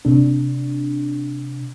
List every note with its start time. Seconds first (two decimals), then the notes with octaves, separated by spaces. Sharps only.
0.05 C3 D4